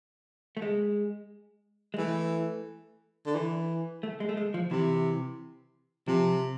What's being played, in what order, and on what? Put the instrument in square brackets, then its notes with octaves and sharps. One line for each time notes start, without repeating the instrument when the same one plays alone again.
[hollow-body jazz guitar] A3
G#3
G#3
[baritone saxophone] E3 [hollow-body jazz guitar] A3
[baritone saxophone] D3
E3
[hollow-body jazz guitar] A3
G#3
A3
G#3
F3
[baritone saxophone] C3 [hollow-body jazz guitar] E3
[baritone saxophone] C3 [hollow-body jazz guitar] F3